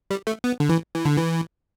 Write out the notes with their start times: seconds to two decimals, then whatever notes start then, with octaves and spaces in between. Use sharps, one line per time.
0.11 G3
0.27 A3
0.44 B3
0.60 D3
0.69 E3
0.95 E3
1.05 D3
1.17 E3